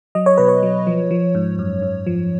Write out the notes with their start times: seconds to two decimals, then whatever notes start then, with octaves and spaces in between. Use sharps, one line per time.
0.15 F#3 D#5
0.26 C#5
0.38 B2 B4
0.48 C#5
0.63 F#3
0.87 F3
1.11 F3
1.35 G#2
1.59 F#2
1.82 F#2
2.07 F3